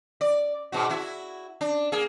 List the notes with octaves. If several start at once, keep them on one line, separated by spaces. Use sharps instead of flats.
D5
G#2 B2 F#4
E4 F#4
D4
A#3 G#4